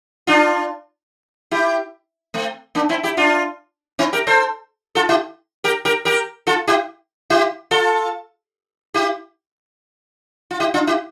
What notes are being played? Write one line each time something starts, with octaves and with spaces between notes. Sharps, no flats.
D4 F4
E4 G4
A3 C4
A#3 D4
C4 E4
E4 G4
D4 F4
C4 E4
G4 A#4
A4 C5
F4 A4
E4 G4
G4 A#4
G4 A#4
G4 A#4
F4 A4
E4 G4
E4 G4
F4 A4
E4 G4
F4
E4 G4
D4 F4
E4 G4